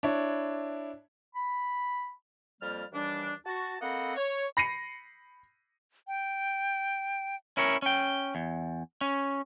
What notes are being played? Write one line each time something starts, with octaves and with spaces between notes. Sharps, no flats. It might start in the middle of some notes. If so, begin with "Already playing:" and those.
D4 E4 C#5
B5
F2 G3 A#3 F6
D#2 E3 G3 D4
F#4 A5
A#3 C4 A4 D#5 F#5 B5
C#5
B5 A#6 C7 C#7 D#7
G5
C#4 E4 A#4 C#5
C#4 G5
E2
C#4